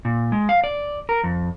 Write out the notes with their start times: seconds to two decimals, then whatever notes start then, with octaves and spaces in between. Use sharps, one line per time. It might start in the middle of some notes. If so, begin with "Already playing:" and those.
0.05 A#2
0.32 G#3
0.49 F5
0.64 D5
1.09 A#4
1.24 F2